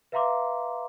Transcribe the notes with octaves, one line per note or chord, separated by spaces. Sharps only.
B4 E5 F5 A#5 C6 D6